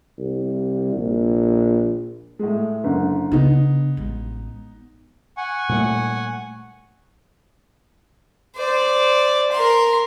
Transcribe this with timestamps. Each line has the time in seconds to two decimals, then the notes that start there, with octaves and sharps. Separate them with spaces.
0.18 C2
0.96 A#1
2.39 A2 G#3
2.84 F#1 D3
3.32 C#3 B3 D4 D#4
3.97 A1 G#3
5.36 F#5 G#5 C#6
5.69 A#2 G3 A3
8.56 C5 D5
9.52 A#4 C6